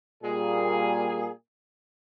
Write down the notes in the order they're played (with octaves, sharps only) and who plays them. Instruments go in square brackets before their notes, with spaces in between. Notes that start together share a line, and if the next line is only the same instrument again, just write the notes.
[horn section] A#2 G3 A#3 G#4